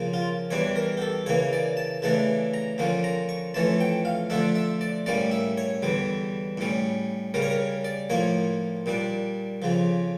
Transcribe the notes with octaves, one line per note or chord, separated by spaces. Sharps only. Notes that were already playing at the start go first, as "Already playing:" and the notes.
Already playing: C#3 F3 A#3
F4
E2 E3 G3 D4 C#5
A#4
G4
A4
C#3 E3 A#3 C#5
D5
A5
C#3 E3 A3 D4 A5
A#5
D3 F3 A#3 C#4
A#5
C#6
F2 E3 A3 C#4 A5
G5
F5
D3 F3 A3 D4 E5
E5
D5
A2 G3 A#3 C#4 D5
E5
C#5
E2 D3 G3
A2 G3 C#4
C#3 G3 C#4 A#4
C#5
A#4
D5
A2 F3 A#3 C#5
A#2 G3 D4
F2 C#3 F3